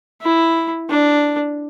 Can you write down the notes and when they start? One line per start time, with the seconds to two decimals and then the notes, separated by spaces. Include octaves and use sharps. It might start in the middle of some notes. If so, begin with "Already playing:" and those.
0.22 E4
0.90 D4